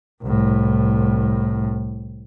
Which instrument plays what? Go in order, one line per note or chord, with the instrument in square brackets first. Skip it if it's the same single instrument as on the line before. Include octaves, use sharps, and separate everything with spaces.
[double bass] C2 A2